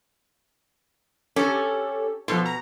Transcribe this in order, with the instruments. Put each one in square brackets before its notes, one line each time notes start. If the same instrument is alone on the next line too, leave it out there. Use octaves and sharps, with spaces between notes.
[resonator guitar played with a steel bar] C#4 [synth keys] G4 A4
[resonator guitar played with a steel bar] B2 [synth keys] F3 A4 C6
[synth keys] A#5